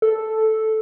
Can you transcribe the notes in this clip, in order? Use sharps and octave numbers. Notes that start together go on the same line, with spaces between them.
A4